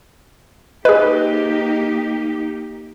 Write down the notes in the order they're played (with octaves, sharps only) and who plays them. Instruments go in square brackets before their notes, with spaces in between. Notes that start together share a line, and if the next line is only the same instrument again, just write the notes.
[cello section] A#3 D#4 G4 [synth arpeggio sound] G#4 B4 [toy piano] D#5